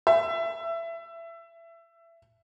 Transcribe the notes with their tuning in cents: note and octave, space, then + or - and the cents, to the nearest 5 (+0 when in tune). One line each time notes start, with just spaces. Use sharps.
E5 +20